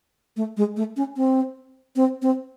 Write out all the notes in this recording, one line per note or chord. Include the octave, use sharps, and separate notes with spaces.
A3
G#3
A3
C#4
C4
C4
C4